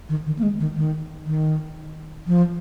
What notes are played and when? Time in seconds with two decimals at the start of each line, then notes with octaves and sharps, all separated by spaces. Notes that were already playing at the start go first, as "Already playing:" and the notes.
0.09 D#3
0.26 D#3
0.39 A#3
0.43 G#3
0.60 D#3
0.76 D#3
1.26 D#3
2.27 F3